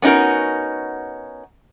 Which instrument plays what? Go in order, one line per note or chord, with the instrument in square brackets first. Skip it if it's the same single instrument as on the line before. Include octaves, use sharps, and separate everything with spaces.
[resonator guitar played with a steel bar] B3 C#4 D#4 F#4 A#4